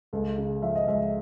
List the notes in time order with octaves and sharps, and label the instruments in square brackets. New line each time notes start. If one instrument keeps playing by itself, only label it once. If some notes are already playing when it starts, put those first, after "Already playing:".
[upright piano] C#2 A4
C#3
F3 E5
D#5
C#2 E5